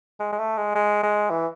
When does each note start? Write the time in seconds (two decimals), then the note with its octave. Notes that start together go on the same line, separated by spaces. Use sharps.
0.19 G#3
0.32 G#3
0.38 A3
0.57 G#3
0.75 G#3
1.03 G#3
1.30 E3